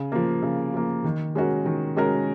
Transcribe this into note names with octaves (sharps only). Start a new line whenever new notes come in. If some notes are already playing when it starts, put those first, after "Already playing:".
Already playing: C#3
F3 A#3
C#3
F3 A#3
D#3
G#3 C#4 F#4 A#4
D#3
G#3 C#4 F#4 A#4